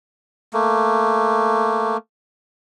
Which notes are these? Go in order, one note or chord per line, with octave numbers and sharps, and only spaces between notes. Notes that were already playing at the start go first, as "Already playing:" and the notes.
A3 A#3